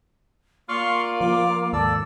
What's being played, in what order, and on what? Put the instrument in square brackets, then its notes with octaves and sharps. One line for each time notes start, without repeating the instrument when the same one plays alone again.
[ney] A#3 [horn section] F4 D5 F5 [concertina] C6 C#6 F6
[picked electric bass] F3 [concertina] D6
[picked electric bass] D#2 G#2 [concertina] A4 D5 E6